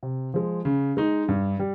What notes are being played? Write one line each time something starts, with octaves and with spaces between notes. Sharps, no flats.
C3
F3 G#3
C#3
G#3 D#4
G2
G3